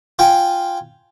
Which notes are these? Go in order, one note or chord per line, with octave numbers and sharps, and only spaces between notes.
F4 G5 G#5